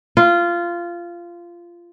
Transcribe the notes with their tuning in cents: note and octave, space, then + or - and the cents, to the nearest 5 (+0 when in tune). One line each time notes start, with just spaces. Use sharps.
F4 -15